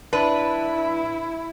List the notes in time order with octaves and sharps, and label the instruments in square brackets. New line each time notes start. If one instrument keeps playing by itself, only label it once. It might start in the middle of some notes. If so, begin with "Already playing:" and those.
[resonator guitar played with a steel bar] D4 B4 [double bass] E4